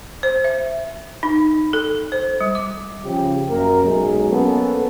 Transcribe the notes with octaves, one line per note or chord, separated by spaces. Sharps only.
C5
E5
D#4
A4
C5
G3
D6
C#3 F3 G4
F#2 A#3 A#4
B1 F#3 G#3 G#4
A#3 B3 C#4 A4